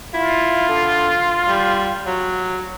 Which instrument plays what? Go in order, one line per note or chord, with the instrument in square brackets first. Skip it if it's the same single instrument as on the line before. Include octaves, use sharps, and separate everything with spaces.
[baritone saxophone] E4 [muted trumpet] F4
[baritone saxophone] D3
G3
F#3